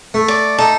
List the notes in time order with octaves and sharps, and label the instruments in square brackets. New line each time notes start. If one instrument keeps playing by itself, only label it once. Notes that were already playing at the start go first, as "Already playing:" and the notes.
[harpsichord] A3
[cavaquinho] D5
[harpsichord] D#4 [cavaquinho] A4